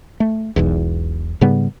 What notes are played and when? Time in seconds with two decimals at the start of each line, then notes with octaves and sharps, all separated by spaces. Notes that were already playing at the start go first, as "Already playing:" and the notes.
0.20 A3
0.56 E1 B1 E2
1.41 G#2 C#3 G3 B3